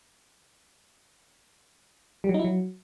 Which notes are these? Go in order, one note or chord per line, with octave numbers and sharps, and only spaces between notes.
G3
F#3
D#4
E4
F#3